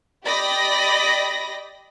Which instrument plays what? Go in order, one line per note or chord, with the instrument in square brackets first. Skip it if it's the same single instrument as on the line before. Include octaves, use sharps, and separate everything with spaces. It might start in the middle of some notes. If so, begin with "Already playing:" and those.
[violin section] G4 D5 D#5 B5 A#6